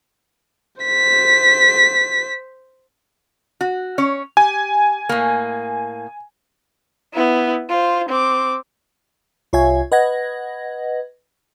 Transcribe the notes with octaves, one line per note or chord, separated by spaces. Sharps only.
C5 B6
F#4
C#4 C#5
G4 G#5
A2 A#3
B3 E4
F4 C5
C4 D6
C2 F4 C#5 E5 G#5 G#6
B4 D#5 F#5 G#6 A#6